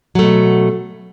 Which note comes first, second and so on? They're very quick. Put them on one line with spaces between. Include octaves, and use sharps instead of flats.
F#3 A3 B2